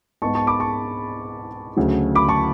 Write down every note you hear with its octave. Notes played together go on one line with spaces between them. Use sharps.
G#2 G#3 B3 A5 C#6
A5 C#6
B5 D6
A5 C#6
D2 C#3 F#3 A3
B5 D6
A5 C#6